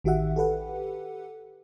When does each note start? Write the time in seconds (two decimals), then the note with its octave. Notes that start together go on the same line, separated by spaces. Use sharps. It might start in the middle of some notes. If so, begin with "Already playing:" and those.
0.04 A1 D#3 F#4 G4 E5 F#5
0.36 G4 A4 B4 F#5